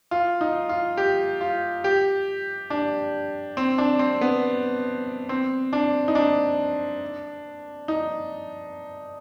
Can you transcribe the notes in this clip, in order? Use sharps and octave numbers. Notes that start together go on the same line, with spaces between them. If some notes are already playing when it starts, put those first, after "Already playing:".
F4
D#4
F4
G4
F4
G4
D4
C4
D4
C4
B3
C4
D4
D#4
D4
D#4